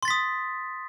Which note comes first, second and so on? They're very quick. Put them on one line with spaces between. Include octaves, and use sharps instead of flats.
C6 A6 B6 D#6